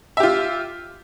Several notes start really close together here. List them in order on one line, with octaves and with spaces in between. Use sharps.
E5 G4 F4